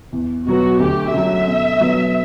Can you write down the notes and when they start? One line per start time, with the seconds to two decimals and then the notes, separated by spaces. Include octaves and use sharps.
0.12 E2
0.46 B2 F#3 B3 F#4
0.80 D2 G4
1.13 C#3 F#3 E5
1.47 B2
1.80 F#3 B3